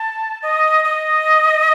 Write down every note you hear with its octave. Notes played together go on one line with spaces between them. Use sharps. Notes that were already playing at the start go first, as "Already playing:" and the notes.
Already playing: A5
D#5
D#5